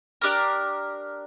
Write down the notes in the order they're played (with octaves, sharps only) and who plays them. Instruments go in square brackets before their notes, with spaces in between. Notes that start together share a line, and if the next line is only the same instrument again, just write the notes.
[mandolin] D4 G4 A#4